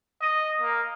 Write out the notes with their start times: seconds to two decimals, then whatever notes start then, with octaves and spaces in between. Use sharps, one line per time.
0.21 D#5
0.61 A#3